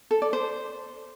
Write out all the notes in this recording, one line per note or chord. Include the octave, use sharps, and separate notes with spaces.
A4
D5
C5